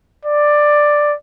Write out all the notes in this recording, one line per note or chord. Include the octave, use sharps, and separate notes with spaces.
D5